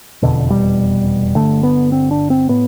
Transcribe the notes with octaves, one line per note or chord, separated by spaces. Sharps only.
F1 E2 B2 D3
G3
G1 F2 D3 A3
B3
C4
D4
C4
A2 B3